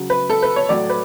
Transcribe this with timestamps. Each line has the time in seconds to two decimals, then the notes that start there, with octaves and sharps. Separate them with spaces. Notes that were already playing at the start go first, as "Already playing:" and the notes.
Already playing: C#3 F#3
0.10 B4
0.30 A4
0.43 B4
0.56 C#5
0.69 A2 F#3 D5
0.90 B4